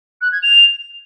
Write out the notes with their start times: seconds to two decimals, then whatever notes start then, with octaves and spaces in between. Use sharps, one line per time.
0.21 F#6
0.32 G#6
0.42 F7